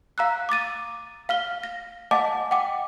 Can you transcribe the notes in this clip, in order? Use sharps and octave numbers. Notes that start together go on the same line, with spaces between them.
F5 A#5 E6 F#6
D6 D#6 A6 D#7
F5 F6 G7
A#6
D#5 F5 F#5 G#5 A5 D6
F#5 G5 D6